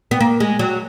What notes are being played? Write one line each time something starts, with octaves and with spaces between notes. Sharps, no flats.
B3
A#3
G#3
F#3